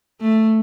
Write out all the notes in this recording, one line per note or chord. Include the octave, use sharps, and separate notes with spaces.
A3